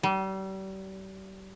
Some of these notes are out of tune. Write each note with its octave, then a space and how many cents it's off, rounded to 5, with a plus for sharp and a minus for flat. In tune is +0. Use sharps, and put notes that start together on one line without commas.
G3 -35